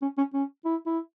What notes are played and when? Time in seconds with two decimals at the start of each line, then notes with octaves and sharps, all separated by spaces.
0.02 C#4
0.18 C#4
0.34 C#4
0.65 E4
0.86 E4